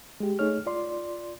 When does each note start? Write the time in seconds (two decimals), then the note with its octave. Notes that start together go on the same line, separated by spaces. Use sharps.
0.20 G#3 G4
0.39 A3 D#4 G#4 C#5 F6
0.66 F4 D5 C6